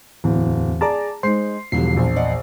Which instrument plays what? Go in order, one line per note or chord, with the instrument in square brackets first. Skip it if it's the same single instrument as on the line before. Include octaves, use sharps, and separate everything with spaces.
[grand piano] D1 [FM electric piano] E2
[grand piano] G#4 A#5 D6 [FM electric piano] D5 A5
[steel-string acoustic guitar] G#3 D#4 [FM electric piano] C5 [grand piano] C7
[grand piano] E1 G3 [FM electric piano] E2 C7 [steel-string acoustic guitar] D3 F3 E4
[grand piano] A#1
[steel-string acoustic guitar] D5 D#5 F#5